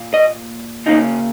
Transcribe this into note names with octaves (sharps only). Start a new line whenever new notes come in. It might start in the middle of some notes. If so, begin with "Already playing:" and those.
Already playing: A#2 A#3
D#5
C#3 A#3 C#4 D#4